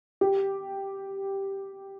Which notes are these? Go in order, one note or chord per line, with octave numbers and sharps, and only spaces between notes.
G4